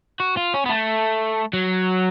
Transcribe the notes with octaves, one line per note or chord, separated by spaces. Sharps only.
F#4
F4
C#4
B3
A3
F#3